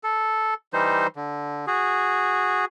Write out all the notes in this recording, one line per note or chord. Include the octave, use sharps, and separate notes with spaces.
A4
E3 G3 D#4 C5
D3
F#4 G#4